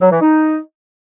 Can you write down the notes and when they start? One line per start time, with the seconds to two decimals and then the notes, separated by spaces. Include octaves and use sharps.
0.01 F#3
0.11 E3
0.22 D#4